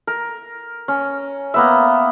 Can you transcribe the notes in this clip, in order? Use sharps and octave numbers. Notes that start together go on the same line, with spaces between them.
A#4
C#4
A#3 B3 E5